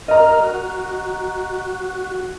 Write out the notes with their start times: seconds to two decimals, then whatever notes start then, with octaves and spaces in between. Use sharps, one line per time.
0.08 A#4 D#5 A#5 F6
0.42 F#4